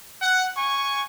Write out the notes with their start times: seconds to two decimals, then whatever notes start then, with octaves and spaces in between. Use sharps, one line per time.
0.22 F#5
0.57 G#5 C#6